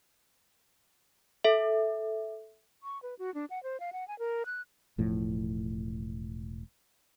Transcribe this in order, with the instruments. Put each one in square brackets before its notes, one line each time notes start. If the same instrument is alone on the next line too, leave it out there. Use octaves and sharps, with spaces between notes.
[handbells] A4 E5
[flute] C#6
B4
F#4
D4
F#5
C5
F5
F#5
G#5
A#4
F#6
[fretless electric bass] E1 A2 F3